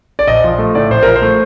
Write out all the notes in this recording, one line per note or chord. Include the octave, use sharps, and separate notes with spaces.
D5
A#1 D#5
F3
A3
A2 D5
A#1 C5
F3 A#4
C5
A3